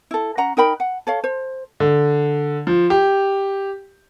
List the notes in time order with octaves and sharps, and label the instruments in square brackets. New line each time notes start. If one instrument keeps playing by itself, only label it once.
[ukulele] E4 A4
C#4 F#5 A#5
D#4 A#4 G5 B5
F#5
A4 C#5 F5
C5
[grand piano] D3
F3
G4